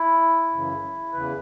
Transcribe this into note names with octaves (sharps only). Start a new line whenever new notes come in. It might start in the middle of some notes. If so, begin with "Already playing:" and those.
Already playing: E4
F#2 C#3 E3
E2 C#3 E3 B4